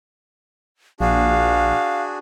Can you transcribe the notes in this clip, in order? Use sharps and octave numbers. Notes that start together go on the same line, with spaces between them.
A#1 D4 F#4 G#4 F5